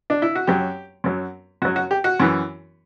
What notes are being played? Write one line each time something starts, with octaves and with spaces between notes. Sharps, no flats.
D4
E4
F#4
F#2 F#3 G4
F#2 F#3
F#2 F#3 F#4
F#4
G4
F#4
F#2 E3